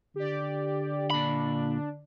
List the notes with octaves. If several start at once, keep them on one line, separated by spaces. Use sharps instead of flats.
D3 G4 D5
A#2 D4 B5